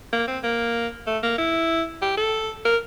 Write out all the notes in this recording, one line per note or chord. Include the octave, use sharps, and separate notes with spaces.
A#3
C4
A#3
A3
A#3
E4
G4
A4
A#4